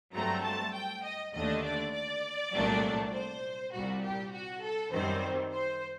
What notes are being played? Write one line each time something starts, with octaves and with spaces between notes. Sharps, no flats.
G2 F#3 A3 C4 A#5
A5
G5
D#5
D#2 D3 A3 D4 D#5
D5
D5
C2 A#2 F#3 A3 D4
C5
C2 A#2 G3 F#4
G4
F#4
A4
F#2 D#3 G3 C4 C5
C5